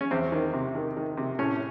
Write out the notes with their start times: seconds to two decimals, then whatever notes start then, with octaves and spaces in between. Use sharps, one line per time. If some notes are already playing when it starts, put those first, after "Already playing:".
0.01 C#4
0.11 E2 C4
0.32 D#3
0.53 C3
0.75 D#3
0.97 D#3
1.17 C3
1.39 A2 C#4